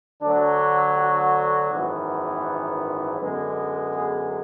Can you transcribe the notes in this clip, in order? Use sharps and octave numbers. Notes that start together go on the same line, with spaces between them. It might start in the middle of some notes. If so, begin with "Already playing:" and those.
D2 D3 F#3 D4
F#4
G#1 F#2 E3 B3
F#2 D3 G#3 B3
G#4